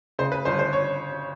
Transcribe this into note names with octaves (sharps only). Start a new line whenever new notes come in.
C#3 C5
B4
G1 C5
C5
C#5